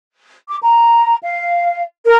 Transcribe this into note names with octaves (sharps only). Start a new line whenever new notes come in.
D6
A#5
F5
A#4